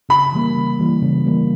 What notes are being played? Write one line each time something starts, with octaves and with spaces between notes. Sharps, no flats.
C#3 B5
E3 G3 A#3
C#3
E3 G3 A#3
C#3
E3 G3 A#3